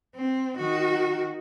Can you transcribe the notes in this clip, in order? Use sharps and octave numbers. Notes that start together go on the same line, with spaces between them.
C4
D#3 F#4